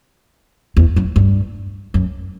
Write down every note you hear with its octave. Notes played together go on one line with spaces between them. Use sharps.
E2
F#2
G2
F#2